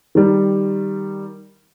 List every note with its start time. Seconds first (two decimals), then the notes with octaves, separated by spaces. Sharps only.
0.15 D#3 G3